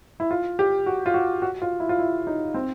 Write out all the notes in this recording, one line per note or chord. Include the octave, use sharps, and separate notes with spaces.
E4
F4
G4
F#4
F4
F#4
F#4
F4
E4
F4
E4
D#4
C4